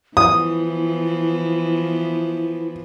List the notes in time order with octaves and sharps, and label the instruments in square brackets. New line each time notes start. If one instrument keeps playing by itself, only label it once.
[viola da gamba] E3 F3 B3 [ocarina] E4 [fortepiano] D#6